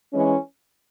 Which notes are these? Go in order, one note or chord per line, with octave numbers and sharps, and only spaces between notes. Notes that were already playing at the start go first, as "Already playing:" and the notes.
E3 G#3 C#4